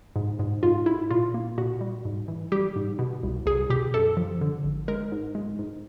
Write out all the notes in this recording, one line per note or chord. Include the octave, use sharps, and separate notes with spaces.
G#2
G#2
G#2 F4
G#2 E4
A#2 F4
A#3
A#2 F#4
G3
G#2
E3
G3 G4
G#2
B2
C2
C2 G#4
B2 G4
F#2 A4
F3
D3
G#1
G#3 A#4
G#2
G#3
G#2